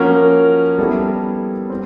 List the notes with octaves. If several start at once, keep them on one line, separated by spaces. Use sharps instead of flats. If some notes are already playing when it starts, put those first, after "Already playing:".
Already playing: F3 A#3 C#4 F#4 A#4
G3 B3 E4 A4
C4